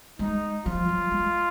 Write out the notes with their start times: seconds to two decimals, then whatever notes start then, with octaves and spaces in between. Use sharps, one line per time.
0.18 G#3 D#4
0.65 F3 F4
0.89 F#3
1.12 G#3